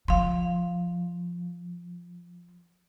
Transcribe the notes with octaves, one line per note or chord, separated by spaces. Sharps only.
F3 F5 C6